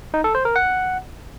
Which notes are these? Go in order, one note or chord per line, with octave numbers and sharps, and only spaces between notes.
D#4
A4
C5
A#4
F#5